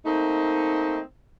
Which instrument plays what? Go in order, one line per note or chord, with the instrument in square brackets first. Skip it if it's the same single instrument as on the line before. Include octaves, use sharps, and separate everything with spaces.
[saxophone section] A3 A#3 C4 D#4